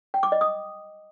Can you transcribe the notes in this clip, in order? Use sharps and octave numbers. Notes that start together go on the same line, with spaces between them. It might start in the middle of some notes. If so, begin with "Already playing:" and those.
G5
D6
D#5
D#6